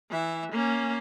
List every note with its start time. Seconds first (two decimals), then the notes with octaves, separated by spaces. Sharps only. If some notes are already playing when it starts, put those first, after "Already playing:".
0.10 E3 E5
0.52 A#3 C#4